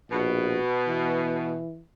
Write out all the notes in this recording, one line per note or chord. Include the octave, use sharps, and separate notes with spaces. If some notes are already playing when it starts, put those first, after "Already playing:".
A#1 B2
E3